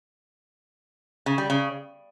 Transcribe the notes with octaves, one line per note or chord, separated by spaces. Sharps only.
C#3
G3
C#3